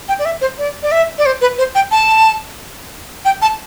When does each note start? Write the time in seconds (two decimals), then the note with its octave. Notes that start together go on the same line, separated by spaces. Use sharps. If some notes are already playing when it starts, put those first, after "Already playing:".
0.08 G5
0.19 D5
0.25 E5
0.41 C5
0.58 D5
0.83 D5
0.92 E5
1.18 D5
1.26 C5
1.41 B4
1.58 C5
1.75 G5
1.91 A5
3.25 G5
3.42 A5